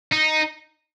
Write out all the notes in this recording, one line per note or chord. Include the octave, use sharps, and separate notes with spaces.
D#4